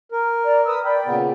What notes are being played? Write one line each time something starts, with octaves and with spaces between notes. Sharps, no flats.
A#4
D5 A#5
B4 D#6 E6
D5 G5 B5
A#2 C#3 B3